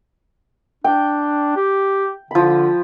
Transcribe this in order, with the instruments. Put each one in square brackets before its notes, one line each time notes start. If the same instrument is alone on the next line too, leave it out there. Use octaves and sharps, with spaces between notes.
[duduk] D4 [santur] G5
[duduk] G4
[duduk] D3 [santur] F3 B5